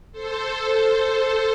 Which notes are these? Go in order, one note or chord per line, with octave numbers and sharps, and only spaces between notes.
A4 C5